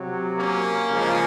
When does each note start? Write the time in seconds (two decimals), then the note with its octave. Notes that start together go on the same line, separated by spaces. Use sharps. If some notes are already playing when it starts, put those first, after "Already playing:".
Already playing: C3 F#3
0.38 A#3 C#4
0.91 C#3 F3 G#3